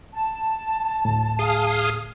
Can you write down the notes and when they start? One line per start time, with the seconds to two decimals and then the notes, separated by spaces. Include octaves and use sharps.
0.13 A5
1.05 D2 A2
1.39 G#4 F5 D#6